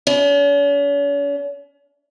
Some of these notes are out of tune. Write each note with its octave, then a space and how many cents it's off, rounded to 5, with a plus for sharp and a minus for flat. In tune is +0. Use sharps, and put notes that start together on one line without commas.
C#4 +45